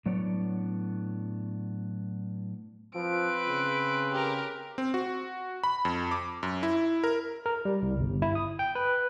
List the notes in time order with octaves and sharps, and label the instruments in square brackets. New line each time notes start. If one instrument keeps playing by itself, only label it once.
[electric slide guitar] A2 F#3 B3 D4 C#5 D5
[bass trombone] F3 [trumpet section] C4 B4 [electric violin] D7
[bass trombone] C#3
[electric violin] G4 A#4
[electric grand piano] C4
F#4
B5
F2
D6
F#2
E4
A#4
[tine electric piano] A#4
G3
C2
G1
E4
D#6
G5
B4